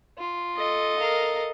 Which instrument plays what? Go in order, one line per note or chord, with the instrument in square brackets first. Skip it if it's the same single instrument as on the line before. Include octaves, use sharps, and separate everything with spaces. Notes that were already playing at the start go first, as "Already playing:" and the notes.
[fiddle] F4
[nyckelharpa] A4 D#5
[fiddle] A#4 F5